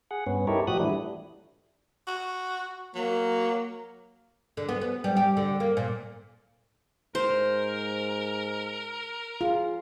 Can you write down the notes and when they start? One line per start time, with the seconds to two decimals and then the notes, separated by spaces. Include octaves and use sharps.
0.11 G#4 F#5
0.26 G2 B3 C#4
0.47 D#4 E4 G4 A4 A#4 C#5
0.67 A2 F3 F#4 G4 D#6 F#6
0.80 E3 G3 A3 D4 E4
2.08 F#4
2.95 F#3 A#3
4.57 D3
4.69 B3
4.81 B3
5.04 G3
5.16 G4
5.37 D3
5.60 A#3
5.77 A#2
7.15 G#2 A#4 C5
9.41 F4 G#4